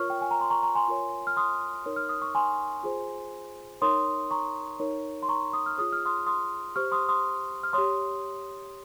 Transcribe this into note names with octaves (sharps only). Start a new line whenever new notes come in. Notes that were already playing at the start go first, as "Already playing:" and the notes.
Already playing: F4 A#4 C#5 C#6 F6
G5
G#5
A#5
C6
A#5 C#6
A#5 C#6
G#5 C6
F4 A#4 C#5
F6
C6 D#6
D#4 A#4 C#5
F6
D#6
C#6
G#5 C6
F4 G#4 C5
D#4 A#4 C#5 C6 D#6
A#5 C#6
D#4 A#4 C#5
C6
A#5 C#6
D#6
F6
F4 G#4 C#5 D#6
F6
C6 D#6
C6 D#6
G4 C5 C#6 F6
C6 D#6
C6 D#6
F6
G4 C#5 C6 D#6